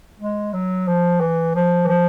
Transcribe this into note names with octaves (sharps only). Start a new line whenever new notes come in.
G#3
F#3
F3
E3
F3
E3
F3